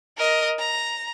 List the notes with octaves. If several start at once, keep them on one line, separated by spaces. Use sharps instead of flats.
A#4 D#5
A#5